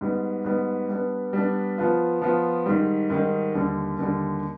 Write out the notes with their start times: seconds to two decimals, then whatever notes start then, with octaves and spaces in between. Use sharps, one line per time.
0.01 G#2 G3 B3
0.45 G#2 G3 B3
0.89 G3 B3 D4
1.33 G3 B3 D4
1.78 F3 B3 F4
2.22 F3 B3 F4
2.66 G#2 D#3 G3
3.10 G#2 D#3 G3
3.54 D#2 D3 G3
3.99 D#2 D3 G3